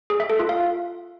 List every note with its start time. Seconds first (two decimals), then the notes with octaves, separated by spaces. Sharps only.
0.10 G#4
0.20 E5
0.30 A4
0.39 F4
0.49 F5